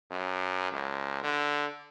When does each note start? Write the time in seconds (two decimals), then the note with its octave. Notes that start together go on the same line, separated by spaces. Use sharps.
0.10 F#2
0.72 C#2
1.23 D3